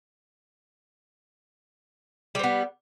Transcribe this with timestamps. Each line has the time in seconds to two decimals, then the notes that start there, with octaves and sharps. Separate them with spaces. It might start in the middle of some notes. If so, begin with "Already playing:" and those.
2.35 G3
2.39 C4
2.44 B3